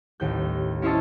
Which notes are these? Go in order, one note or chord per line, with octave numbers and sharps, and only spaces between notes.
A1 D#2 G6
C#4 E4 C5 C#5 D#5 A5